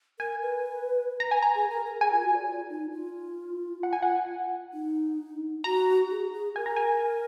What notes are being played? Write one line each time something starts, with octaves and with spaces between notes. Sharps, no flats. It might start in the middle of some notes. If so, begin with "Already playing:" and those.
A#4 G#5
B4
A#5
G#5
A#5
G#4
A#4
A#4
G#4 G#5
F4
F#4
D5
F4
D#4
F4
F#5
G#5
F#5
D#4
F#4 A#5
G#4
G#4
A#4 G#5
A#5
G#5